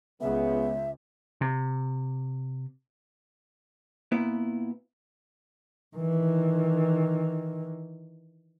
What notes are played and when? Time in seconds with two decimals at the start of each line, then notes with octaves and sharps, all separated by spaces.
0.21 C#2 C#3 B3 G#4 E5
1.41 C3
4.12 A#2 B3 E4
5.97 D#3 E3